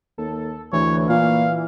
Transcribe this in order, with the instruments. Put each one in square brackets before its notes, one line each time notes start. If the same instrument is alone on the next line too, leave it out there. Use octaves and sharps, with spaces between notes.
[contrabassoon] D#2 [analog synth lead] A4
[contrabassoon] D2 [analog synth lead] E3 [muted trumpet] C#5
[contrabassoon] A#2 [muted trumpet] F5